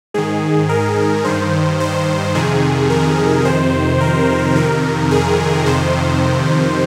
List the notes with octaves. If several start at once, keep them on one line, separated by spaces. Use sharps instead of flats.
G#2 D#3 G#4
A#4
G2 D#3 C5
C5
F2 C3 D#3 G#4
A#4
F2 C3 D#3 C5
A#4
F2 C3 D#3 A#4
G#4
F2 C3 D#3 C5